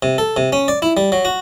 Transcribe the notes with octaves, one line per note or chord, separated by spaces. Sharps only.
C3
A4
C3
C#4
D5
E4
G3
F#3
F#4